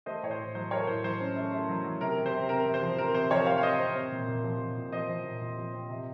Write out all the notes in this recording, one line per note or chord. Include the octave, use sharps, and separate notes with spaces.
A3 C5 D#5
A2 C#5
C5
A2
F#3 C5
A3 A#4 C#5
A2 C5
F#3 C5
C#4
A3
A3
F#3
F#3
C3 A#4
C3
C5
C3
C4 A#4
C3
C5
F3
C4 A#4
C3 C5
F3 A#4 C#5
F3 C#5 F5
F5
C4 C5 D#5
C4 C5
C4
A#2
A#2
F3
A#2
A#2
F3 C5 D#5
F3
A#2
A#2
F3
C4
C3